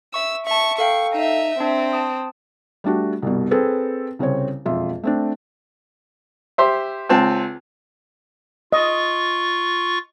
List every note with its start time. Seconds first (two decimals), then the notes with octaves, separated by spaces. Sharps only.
0.14 E5 C#6 E6
0.47 E5 A5 C#6
0.78 A4 F5 G5 C#6
1.13 D#4 E5
1.59 C4 D4 E5
1.93 A5 D#6
2.84 G3 A3 D4 F#4
3.22 C2 G2 B2
3.51 C4 G#4 A4 B4
4.19 C2 C#3 C4 C5 C#5
4.65 E1 F2 F4 E5
5.03 A3 C4 D4
6.58 G4 C5 E5
7.09 C#2 C4 A5
8.72 F4 D#5 C#6